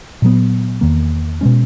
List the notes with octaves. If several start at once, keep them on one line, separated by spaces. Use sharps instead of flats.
A#2 F#3 B3
E2 D#3 A#3
B2 G#3 C#4